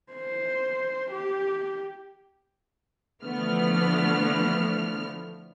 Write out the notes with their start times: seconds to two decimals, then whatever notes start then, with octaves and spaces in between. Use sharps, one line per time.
0.13 C5
1.11 G4
3.23 D3 E3 F3 A3 B3 F6